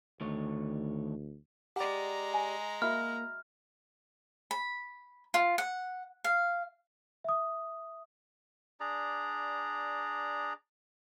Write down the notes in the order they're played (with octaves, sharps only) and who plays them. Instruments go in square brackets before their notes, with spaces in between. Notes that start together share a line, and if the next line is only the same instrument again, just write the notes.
[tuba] D2 [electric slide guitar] D#3 A3 C#5
[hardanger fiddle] G#3 A#5 [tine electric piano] G4 D5 [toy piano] F#5
[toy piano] G#5
[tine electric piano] A#3 [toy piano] F#4 E5 B5 [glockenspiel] F6
[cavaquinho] B5
F4
F#5
F5
[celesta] E5 D#6
[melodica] D4 G#4 D5 A#5